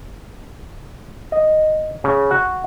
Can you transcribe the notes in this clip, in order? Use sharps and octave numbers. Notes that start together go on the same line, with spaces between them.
D#5
C#3
F#4